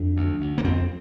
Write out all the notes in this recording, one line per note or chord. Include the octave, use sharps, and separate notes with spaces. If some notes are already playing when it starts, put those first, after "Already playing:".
Already playing: F2 D4
D2
D2
A#3
F2 C4